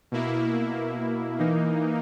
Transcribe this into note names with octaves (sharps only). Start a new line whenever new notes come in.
B2 A#3 E4
E3 A#3 D#4